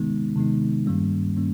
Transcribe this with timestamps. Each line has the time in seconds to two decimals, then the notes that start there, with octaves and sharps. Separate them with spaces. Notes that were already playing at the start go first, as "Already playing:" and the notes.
Already playing: C3 D#3 G#3 B3 D#4
0.36 C3 D#3 G#3 B3 D#4
0.86 G2 D#3 G3 A#3 C#4
1.37 D#3 G3 A#3 C#4